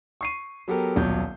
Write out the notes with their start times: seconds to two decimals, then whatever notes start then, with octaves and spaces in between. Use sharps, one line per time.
0.21 C#6 C7 D#7
0.68 F#3 B3 G4 A4 A#4
0.96 D#1 B1 F#3 G6